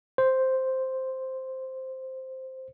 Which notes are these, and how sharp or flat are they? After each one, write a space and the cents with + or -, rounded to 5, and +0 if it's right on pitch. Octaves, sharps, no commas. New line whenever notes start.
C5 +0